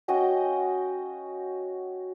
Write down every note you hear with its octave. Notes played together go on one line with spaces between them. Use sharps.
C#4 F#4 D#5 G5